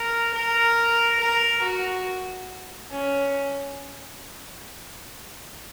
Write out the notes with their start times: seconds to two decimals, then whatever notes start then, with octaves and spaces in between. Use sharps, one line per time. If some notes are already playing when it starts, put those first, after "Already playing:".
Already playing: A#4
0.35 A#4
1.21 A#4
1.63 F#4
2.91 C#4